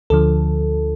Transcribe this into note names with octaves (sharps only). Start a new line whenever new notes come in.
D2 D3 F3 A4